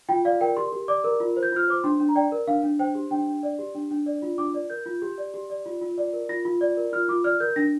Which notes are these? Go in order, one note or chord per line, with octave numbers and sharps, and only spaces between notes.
F4 G5
D5 F5
A#4 G5
G4 C6
G4
D5 D6
A#4
F4
C5
G6
F4 F6
C5 D6
D4 C6
D4
A#5
D5 G5
A#4
D4 F5
D4
C5 G5
G4
D4 G5
D4
D5
G4
D4
D4
D5
F4
D4 D6
D5
A#4 G6
F4
G4
D5
G4
D5
F4
F4
D5
A#4
F4 A#6
F4
D5
A#4
F4 F6
F4 D6
D5 F6
A#4 G6
D4 A#6